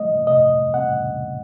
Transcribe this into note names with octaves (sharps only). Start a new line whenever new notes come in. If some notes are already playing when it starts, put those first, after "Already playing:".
Already playing: F3 A3 D#5
C3 D#5
C4 F#5